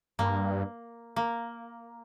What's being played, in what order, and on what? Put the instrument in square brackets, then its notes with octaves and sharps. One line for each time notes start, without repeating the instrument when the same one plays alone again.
[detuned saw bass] G2 [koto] A#3
[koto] A#3